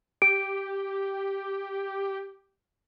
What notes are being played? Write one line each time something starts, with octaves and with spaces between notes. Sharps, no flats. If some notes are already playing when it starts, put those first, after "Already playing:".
G4 D7